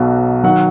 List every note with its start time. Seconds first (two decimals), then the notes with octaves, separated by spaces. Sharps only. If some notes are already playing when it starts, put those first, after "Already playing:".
Already playing: B1 B2 F#3
0.44 D#3 F#3 F#5